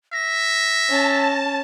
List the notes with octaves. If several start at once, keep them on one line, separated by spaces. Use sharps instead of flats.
E5 A#6
C#4 A5